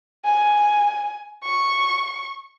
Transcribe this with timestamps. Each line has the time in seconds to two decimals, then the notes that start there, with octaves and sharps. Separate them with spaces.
0.25 G#5
1.44 C#6